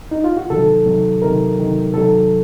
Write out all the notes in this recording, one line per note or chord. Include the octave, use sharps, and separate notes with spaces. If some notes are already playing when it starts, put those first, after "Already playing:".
D#4
F4
F#4
C3 D#3 F#3 A4
C3 D#3 F#3
C3 D#3 F#3 A#4
C3 D#3 F#3
C3 D#3 F#3 A4